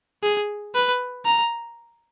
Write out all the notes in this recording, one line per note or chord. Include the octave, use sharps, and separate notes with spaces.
G#4
B4
A#5